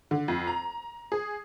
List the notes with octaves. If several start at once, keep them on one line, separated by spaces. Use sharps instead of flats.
D3
F2
A#5
G#4